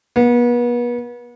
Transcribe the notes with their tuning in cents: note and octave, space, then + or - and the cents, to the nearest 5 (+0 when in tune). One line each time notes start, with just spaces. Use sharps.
B3 -35